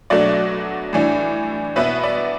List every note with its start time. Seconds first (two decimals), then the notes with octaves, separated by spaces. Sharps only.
0.10 B2 F#3 A3 D4 D5 F#5
0.93 A2 E3 D4
1.76 B2 B3 E4 B4 E5
2.04 D5